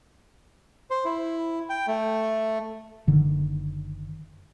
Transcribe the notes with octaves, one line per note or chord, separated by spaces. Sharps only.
C5
E4
G5
A3
F#1 D3 D#3